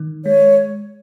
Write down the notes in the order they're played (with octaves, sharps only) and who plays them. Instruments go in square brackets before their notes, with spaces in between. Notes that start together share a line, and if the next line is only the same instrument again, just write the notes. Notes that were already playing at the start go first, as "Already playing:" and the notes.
Already playing: [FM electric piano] D#3
[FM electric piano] G#3 [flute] C#5